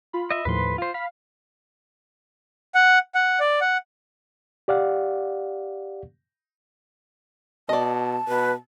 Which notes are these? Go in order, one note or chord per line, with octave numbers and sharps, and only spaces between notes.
F4 B5
D#5 E5
D#2 A2 F3 B4 C6
F4 C5
F5 B5
F#5
F#5
D5
F#5
G4 D5 F5 F#5
B2 D5 D#5 A5
B2 B4